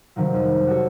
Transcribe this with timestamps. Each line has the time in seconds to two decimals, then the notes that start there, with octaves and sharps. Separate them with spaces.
0.16 G2 C3 D#3 F3 F#3
0.34 F2
0.67 F#4 G4 A4 C#5